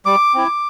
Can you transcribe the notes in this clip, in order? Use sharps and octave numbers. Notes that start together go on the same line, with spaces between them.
G3 D6
C4 E4